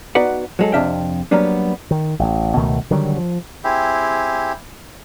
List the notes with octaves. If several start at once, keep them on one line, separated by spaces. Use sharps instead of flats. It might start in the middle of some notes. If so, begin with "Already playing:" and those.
B3 D#4 F#4 B4 D5 F#5
F#3 G#3 A4
F2 C3 D4 E5 F5 G5
F#3 G3 A#3 B3 D4
D#3
A1
C#2 B2 D#3 A3
D3 D#3 F#3 G3
F3
C4 E4 G4 G#4